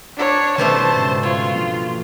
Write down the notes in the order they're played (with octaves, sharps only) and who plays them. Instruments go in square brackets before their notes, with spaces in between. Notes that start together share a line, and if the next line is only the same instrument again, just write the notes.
[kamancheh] D4 C#5
[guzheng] B2 G3 A3 [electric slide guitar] D#3 C#4 [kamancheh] C5 A5
[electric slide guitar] G#2 C#3
[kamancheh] F4 [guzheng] C#5
[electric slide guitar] F3 A#3 D4